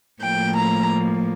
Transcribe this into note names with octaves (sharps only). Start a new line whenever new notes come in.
A2 F3 A#3 G5
A#5